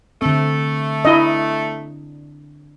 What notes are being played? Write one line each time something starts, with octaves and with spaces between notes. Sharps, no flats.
D3 A3 C4
D4 E4 D#5